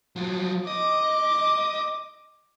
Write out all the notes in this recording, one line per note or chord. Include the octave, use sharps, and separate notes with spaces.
F3 F#3
D#5 D6